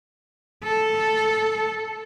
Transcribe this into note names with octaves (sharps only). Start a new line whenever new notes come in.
A4